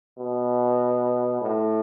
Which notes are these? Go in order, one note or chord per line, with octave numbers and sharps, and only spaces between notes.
B2
A2